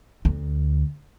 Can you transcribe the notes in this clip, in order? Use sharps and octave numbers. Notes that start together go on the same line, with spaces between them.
D2